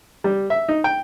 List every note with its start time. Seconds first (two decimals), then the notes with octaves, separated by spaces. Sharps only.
0.24 G3
0.50 E5
0.68 D#4
0.84 G5